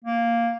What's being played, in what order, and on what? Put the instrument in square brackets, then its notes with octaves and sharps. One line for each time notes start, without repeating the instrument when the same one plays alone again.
[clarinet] A#3